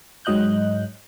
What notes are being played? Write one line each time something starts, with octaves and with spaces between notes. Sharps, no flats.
G#2 F#3 D#5 F#6 G6